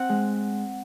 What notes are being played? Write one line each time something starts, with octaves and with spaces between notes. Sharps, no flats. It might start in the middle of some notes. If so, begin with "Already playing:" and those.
Already playing: C4 F#5
G#3